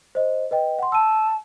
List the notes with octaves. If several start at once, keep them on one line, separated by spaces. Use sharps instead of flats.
C5 D#5
B4 D#5 G5
F#5 C6
A5 E6 D#7